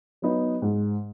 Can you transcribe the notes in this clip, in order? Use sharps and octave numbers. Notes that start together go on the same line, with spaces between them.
F#3 B3 D#4
G#2